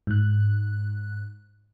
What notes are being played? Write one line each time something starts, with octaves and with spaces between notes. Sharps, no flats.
G#2 F#6